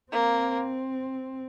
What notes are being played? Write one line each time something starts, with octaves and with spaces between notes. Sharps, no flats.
A#3 C4